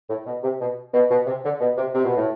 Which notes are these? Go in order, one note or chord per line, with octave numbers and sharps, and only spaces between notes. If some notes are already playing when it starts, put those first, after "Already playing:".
A2
B2
C3
B2
B2
B2
C3
D3
B2
C3
C3
B2
A2